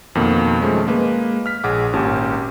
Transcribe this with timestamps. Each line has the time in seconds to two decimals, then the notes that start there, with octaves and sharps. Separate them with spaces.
0.15 F2 B2 D#3 A#3
0.61 D#3 F3 G#3 A3 C#4
0.87 G#3 A#3 B4
1.46 F6 B6
1.64 A#1 G#4 F#5 D6
1.93 G#1 A#2 C#4 G4 A5